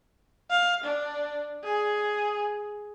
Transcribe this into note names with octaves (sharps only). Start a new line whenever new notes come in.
F5
D4
G#4